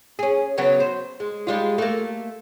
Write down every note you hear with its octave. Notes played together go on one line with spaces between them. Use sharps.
C#4 G#4
C#3 F#3 B3
C5
G#3
G3 G#3 F4
A3 A#3